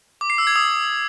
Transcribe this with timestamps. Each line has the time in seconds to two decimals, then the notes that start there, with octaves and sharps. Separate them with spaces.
0.21 D6
0.30 C7
0.38 E6
0.47 G#6
0.56 D#6